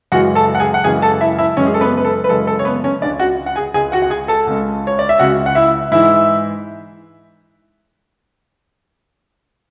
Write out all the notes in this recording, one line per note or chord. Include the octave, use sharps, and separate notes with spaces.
F#2 C#3 E3 G#3 F#4 F#5
A4 A5
F#5
G#4 G#5
F#5
F#2 C#3 E3 G#3 G#4 G#5
A4 A5
E4 E5
E4 E5
F#2 C#3 E3 G#3 C#4 C#5
G#4
A4
B3 B4
B4
A4
B4
F#2 C#3 E3 G#3 A4
A4
C#5
B3 B4
C#4 C#5
C#2 C#3 G#3 D4 D5
F#4 F#5
F#5
G#4 G#5
C#2 C#3 G#3 G#4 G#5
F#4 F#5
F#5
G#4 G#5
A4 A5
C#2 C#3 G#3
C#5
D5
E5
C#2 C#3 G#3 F#4 F#5
F#5
E4 E5
G#2 E3 G#3 E4 E5